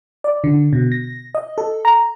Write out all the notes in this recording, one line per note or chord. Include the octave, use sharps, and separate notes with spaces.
D5
D3
B2
A#6
D#5
A4
A#5